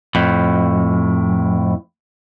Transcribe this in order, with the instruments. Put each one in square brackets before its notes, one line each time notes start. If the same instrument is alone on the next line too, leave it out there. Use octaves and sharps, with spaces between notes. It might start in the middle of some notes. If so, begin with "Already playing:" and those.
[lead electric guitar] F2 A2